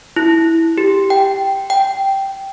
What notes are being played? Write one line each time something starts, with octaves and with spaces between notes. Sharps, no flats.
E4
G4
G5
G5